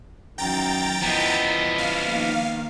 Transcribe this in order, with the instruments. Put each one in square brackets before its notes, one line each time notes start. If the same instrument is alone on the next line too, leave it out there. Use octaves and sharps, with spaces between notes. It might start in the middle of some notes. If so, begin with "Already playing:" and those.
[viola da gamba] F#2 D#3 E3 [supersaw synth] G5 A#5 A6
[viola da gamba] E2 E4 D#5 [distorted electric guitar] F3 B3
[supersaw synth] F5
[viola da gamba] D#3 A#3